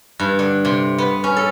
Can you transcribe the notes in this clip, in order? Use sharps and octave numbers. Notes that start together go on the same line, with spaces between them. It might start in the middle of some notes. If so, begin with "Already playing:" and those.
G2
D3
C3
B3
C#4
A4